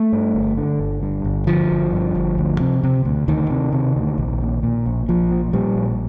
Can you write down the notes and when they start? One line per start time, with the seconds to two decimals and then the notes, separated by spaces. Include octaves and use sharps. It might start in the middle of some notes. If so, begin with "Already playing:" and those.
Already playing: A3
0.13 G2
0.35 G1
0.57 D3
0.80 G1
1.03 G2
1.25 G1
1.47 D3 F3
1.70 G1
1.93 G2
2.15 G1
2.38 D2
2.60 C3
2.84 C3
3.05 D2
3.28 D2 D#3
3.50 C3
3.73 C3
3.96 D2
4.18 A#1
4.41 A#2
4.63 A#2
4.86 A#1
5.08 A#1 F3
5.31 A#2
5.53 A#2 G3
5.76 A#1